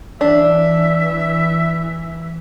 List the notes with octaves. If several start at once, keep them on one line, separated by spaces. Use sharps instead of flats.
E3 D4 E5